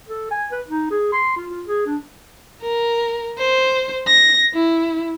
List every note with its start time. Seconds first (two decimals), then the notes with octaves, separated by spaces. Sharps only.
0.08 A4
0.31 G#5
0.52 B4
0.68 D#4
0.90 G#4
1.13 C6
1.37 F4
1.50 F4
1.67 G#4
1.86 D4
2.62 A#4
3.38 C5
4.07 A#6
4.54 E4